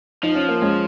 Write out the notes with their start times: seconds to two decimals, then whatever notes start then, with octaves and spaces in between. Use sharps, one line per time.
0.23 F3 D#4
0.35 C#4
0.48 A#3
0.62 G#3 C#4